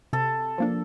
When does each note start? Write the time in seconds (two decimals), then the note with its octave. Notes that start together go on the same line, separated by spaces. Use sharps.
0.13 C3 A4
0.58 F3 A#3 D4